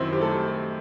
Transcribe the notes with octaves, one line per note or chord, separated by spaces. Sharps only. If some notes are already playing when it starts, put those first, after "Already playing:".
Already playing: F#2 D#3 F#3 C4 E4 C5
G4
A3 A4